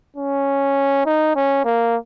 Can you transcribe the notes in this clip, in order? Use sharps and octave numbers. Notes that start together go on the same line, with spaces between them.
C#4
D#4
C#4
A#3